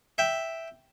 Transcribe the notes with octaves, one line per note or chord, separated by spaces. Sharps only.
E5 G5